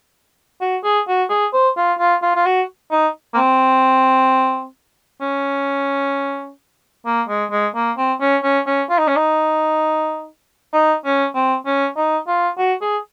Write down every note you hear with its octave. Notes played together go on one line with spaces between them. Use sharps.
F#4
G#4
F#4
G#4
C5
F4
F4
F4
F4
F#4
D#4
A#3
C4
C#4
A#3
G#3
G#3
A#3
C4
C#4
C#4
C#4
F4
D#4
C#4
D#4
D#4
C#4
C4
C#4
D#4
F4
F#4
G#4